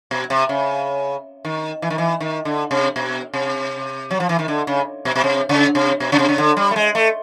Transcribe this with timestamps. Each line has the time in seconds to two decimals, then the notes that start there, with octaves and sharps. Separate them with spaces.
0.11 B2
0.30 C3
0.49 C#3
1.45 D#3
1.82 E3
1.90 D#3
1.98 E3
2.20 D#3
2.45 D3
2.71 C3
2.96 B2
3.34 C3
4.11 F#3
4.20 F3
4.29 E3
4.39 D#3
4.48 D3
4.67 C#3
5.05 B2
5.16 B2
5.24 C3
5.49 C#3
5.75 C3
6.00 B2
6.12 C#3
6.19 C3
6.29 C#3
6.38 D3
6.57 G3
6.71 A3
6.76 G#3
6.95 A3